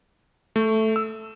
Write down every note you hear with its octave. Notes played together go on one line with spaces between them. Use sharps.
A3
E6